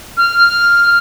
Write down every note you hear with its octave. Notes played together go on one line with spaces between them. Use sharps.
F6